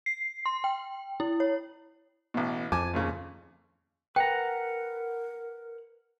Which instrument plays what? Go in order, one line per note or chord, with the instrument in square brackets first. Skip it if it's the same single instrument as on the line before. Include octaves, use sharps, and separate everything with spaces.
[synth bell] C7
C6
G5
E4
C#5
[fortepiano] A1 B2
[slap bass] F2 [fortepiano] G#5 A5 D6
[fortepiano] D#2 A#2 C#3
[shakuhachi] A#4 [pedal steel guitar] B4 F#5 A#5 [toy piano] G5